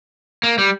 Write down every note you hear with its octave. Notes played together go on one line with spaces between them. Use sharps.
A#3
G3